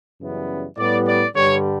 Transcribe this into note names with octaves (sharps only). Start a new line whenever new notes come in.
F#2 C#3 E3 G3 B3
A2 G3 B3 D5
D5
G2 D3 G3 C#5